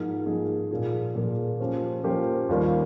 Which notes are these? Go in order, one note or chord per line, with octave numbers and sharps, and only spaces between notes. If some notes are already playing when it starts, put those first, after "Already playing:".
Already playing: G#2 F3 A#3 D#4 G#4
G#2 F3 A#3 D#4 G#4
A#2 F3 A#3 F4 G#4
A#2 F3 A#3 F4 G#4
F3 A#3 C#4 G4 C5
F3 A#3 C#4 G4 C5
D#2 D#3 G3 A#3 F4